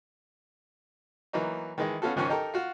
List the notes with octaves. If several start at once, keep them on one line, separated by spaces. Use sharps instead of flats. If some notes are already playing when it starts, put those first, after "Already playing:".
E3 F#3 A#3 D#4
D#3 E3 G#3
B3 C#4 F4 F#4 A4
C#2 G#2 D#3 F3 C#4 C#6
D#4 G4 A4 A#4
F4 F#4